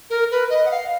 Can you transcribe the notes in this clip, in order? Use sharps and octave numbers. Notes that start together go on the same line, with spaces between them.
A#4
B4
D#5
F#5
F5